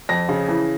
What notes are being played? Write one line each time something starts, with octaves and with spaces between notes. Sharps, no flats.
F2 A#6
C#3
E3